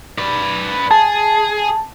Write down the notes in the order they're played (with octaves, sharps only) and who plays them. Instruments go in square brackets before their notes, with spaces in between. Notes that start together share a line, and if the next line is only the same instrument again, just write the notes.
[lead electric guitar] B4 D5
[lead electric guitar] G#4 [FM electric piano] A5